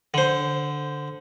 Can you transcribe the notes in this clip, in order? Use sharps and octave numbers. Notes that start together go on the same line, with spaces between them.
D3 C5